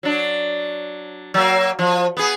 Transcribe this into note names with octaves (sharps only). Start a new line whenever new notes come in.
F#3 D4
F#3 A#3
F3
B3 G#4